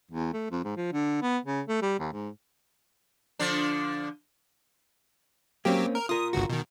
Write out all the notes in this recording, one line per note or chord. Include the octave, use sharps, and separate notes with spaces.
E2
A3
F2
G#2
F3
D3
B3
C#3
A3
G3
D#2
G#2
D3 F3 D4
F#3 A#3 C4 C#4 G4
A#4
F4 A#4 D#6
G1 C#2 F#4
B2 D#3